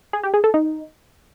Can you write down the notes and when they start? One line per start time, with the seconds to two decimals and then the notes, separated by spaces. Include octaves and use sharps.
0.13 G#4
0.23 G4
0.34 G#4
0.44 A4
0.54 D#4